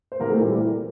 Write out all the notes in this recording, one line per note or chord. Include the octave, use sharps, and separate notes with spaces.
C5
C2 A#3 A#4
A3 A4
A#2 E3 G3 E4